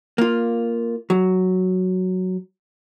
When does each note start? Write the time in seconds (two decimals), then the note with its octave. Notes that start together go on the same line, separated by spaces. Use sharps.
0.18 A#3 F4
1.10 F#3